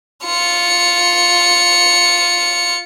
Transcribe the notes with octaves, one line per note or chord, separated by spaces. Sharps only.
F4 C#7